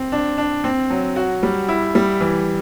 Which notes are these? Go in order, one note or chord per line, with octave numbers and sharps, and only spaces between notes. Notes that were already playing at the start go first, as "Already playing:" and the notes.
Already playing: C4
D4
D4
C4
F#3
F#4
G3
E4
G3
E3